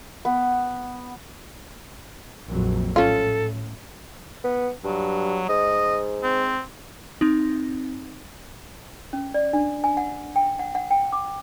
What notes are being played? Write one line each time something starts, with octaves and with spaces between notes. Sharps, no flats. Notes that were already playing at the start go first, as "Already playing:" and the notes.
B3
A#1 F2 F#3
A2 C#4 F4 A4
B3
G2 F#3
G#2 D#5
C4
C4 D#4
C#4
D5
D4
G#5
F#5
G5
F#5
F#5
G5
D6